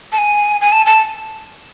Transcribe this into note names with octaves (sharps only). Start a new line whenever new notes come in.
A5
G#5
G#5
A5
A5